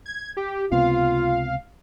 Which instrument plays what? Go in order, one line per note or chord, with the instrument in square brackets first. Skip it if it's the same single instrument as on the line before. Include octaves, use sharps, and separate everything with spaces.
[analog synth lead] G#6
G4
[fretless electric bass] C#2 C3 B3 [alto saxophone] F4 [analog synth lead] F5